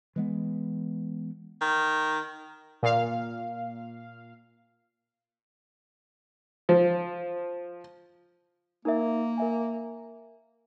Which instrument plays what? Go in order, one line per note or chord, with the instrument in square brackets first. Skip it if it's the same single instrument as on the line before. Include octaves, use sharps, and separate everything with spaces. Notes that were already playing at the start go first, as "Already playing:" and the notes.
[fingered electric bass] E3 G#3 B3
[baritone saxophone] D#3
[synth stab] A#2 F5
[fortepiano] F3
[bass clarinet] A#3 [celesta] D#4 A#4 E5
[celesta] A#4 E5 G#5